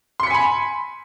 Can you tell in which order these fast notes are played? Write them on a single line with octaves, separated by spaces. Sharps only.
C6 C#7 B6 G#5 B5